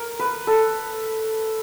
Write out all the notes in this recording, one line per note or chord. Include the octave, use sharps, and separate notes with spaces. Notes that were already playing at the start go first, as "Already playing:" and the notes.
Already playing: A#4
B4
A4